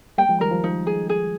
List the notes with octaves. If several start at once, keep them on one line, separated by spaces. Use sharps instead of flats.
G3 A#3 G5
F3 G#3
D#3 G3 A#4
F3
F3 D#4
G#4
G#4